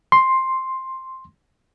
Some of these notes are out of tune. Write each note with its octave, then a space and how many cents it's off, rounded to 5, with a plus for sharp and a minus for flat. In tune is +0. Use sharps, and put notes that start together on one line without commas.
C6 +5